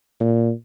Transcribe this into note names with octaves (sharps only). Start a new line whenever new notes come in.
A#2